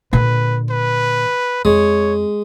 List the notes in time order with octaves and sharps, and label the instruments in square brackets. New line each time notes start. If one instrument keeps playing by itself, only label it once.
[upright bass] A#2 D3 [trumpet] B4
[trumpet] B4
[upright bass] F2 [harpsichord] G#3 [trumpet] C#5